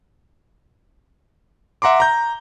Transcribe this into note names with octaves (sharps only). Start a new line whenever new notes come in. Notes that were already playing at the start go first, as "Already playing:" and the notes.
E5 F#5 A#5 C6 D6
A#5 G6